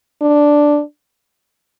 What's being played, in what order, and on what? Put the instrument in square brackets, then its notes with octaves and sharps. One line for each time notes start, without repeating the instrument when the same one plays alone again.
[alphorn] D4